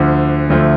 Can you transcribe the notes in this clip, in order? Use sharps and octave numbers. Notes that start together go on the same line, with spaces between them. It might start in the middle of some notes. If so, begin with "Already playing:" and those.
Already playing: D2 D3 F3
D2 D3 F3 A3